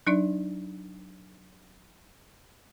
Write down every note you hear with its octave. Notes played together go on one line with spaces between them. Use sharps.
F#3 D4 D#4 D5